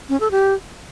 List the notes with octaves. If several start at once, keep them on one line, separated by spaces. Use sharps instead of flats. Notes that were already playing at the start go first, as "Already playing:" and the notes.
C#4
A4
G4